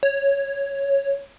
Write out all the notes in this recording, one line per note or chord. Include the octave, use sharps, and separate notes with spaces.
C#5